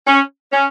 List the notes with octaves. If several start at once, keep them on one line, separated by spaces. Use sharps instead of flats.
C#4
C#4